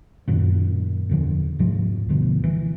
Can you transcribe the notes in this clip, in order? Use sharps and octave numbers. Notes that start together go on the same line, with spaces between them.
F#2 A#2 D#3
E2 D3 F3
D2 G#2 C3 F3
G1 D2 B2 D3
E3